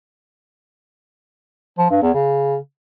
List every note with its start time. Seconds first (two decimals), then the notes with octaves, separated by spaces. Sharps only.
1.78 F3
1.90 G2
2.02 E2
2.14 C#3